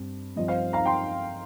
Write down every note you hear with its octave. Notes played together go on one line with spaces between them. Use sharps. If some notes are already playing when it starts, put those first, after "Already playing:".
Already playing: G2 C4
G2 F3 C4 D#5
C5 F5
F5 A#5
G5 C6